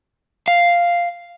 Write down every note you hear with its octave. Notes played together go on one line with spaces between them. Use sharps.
F5